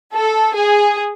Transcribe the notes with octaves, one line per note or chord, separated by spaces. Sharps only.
A4
G#4